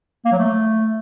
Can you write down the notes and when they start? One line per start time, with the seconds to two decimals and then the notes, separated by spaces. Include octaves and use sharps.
0.25 A#3
0.32 F#3
0.39 A3